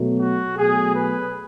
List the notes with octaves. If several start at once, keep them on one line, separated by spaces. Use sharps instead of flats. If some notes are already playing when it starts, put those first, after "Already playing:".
Already playing: B2 F#3 A3
F#4
B2 F#3 A3 G#4
B4